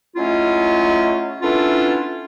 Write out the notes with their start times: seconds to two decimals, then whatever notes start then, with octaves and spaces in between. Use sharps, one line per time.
0.16 F#3 G#3 A3 C#4 E4 F4
1.42 A3 B3 C#4 D4 E4 F4